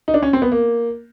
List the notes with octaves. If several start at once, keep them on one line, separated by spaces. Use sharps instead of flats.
D#4
D4
C#4
C4
B3
A#3